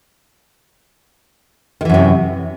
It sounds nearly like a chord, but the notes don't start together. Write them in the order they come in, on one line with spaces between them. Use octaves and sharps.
D#3 E3 F#2 C3